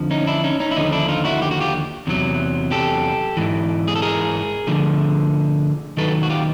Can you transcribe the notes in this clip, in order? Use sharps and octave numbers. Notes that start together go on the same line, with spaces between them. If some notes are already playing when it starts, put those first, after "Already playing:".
Already playing: F2 D3 F3
C#4 D#4
D4 E4
C#4 D#4
C#4 D#4
E4
D#2 D3 F3 C#4 D#4
D4 E4
D#4 F4
E4 F#4
G4
F#4
F4 G4
E2 C3 D#3 F#3
G4 A4
G#2 E3
G#4
A4
G#4 A#4
D2 D3 F3
D#2 D#3 F#3 A4 B4
F#4
F4 G4